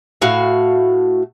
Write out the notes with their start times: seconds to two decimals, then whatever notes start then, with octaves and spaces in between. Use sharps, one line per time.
0.22 A2 F#4 F5